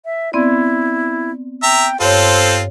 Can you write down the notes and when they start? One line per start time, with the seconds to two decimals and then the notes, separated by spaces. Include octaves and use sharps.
0.05 E5
0.33 B3 C4 E4 D5
1.63 E5 G5 A#5
2.01 G2 C4 F4 A4 C5 C#5